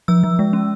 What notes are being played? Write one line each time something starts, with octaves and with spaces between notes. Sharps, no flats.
F3 E6
F3
G#3
C#4